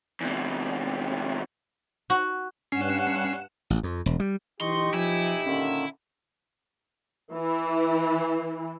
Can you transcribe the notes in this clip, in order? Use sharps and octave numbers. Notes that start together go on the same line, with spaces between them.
E2 C3
F#4
G2 C#4 F#5 C7 E7
A1
F2
E1
G3
B1 E3 D#4 G4 D#5 C6 C#6
F3 E4 G#5
A#2 D3 D#3 C#4
E3